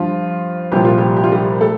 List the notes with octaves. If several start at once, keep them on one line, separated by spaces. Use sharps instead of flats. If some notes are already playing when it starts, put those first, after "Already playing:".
Already playing: G2 F3 F4
C2 A#2 F3 G4
F4
G3 G4
G4
F4
G3 G4
A3 A4